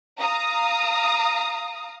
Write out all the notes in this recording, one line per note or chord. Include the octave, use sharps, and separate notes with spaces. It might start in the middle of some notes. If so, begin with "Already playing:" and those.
F5 A#5 D#6